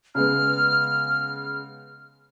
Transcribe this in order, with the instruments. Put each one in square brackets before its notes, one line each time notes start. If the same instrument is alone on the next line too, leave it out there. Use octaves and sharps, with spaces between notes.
[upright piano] C#3 G#3 B3 [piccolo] F6